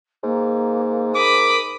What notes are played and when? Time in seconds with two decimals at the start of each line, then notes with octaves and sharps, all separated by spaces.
0.23 G#2 A#3
1.16 A#4 B5 D6 D#6